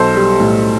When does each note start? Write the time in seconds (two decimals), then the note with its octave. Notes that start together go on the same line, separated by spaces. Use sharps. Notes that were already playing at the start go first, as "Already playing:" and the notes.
Already playing: B1 A4 C5
0.15 G3
0.40 A2